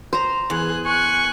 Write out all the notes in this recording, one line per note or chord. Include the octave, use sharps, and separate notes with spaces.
C5 A#5
E2 G#4 F#6
G#5 C#6 F#6